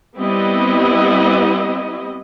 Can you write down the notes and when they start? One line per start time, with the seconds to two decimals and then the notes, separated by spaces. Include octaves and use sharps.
0.19 G3 B3 C4 E4 D#5